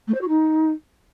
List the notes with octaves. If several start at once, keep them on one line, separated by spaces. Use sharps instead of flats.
A3
C5
F#4
D#4